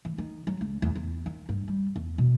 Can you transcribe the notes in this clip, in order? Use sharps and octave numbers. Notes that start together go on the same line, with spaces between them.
E3
D#3
F#3
C#2
E2
E2
D#3
G2
G3
E2
B2